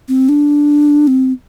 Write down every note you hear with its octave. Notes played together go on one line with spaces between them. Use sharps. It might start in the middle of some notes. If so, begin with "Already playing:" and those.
C4
D4
C4